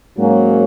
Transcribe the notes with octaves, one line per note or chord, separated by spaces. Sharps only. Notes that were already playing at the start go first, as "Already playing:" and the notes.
G#2 F#3 A#3 C#4